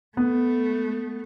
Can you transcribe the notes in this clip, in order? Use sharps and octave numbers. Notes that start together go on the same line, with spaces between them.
A3 B3